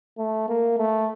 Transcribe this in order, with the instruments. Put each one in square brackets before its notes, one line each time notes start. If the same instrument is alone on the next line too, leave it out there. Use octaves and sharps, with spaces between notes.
[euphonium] A3
A#3
A3